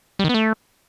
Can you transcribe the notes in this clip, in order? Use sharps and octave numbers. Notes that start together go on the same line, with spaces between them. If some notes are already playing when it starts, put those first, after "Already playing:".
G3
D#3
B3
A3